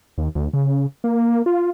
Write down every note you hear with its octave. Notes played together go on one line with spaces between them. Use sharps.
D#2
D2
C#3
A#3
F4